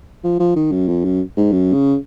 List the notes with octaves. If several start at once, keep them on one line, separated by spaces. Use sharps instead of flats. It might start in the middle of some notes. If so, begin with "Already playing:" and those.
F3
F3
D#3
F#2
F2
F#2
G#2
F#2
C#3